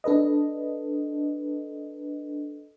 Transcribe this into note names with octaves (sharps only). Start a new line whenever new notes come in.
D4 A4 B4 D#5